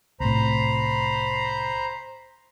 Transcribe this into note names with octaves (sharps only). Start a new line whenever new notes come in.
C2 A2 C5 A#5 B5